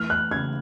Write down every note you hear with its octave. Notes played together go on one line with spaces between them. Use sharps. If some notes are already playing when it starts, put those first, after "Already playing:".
Already playing: E3 A3 F6
F#6
C#3 G#6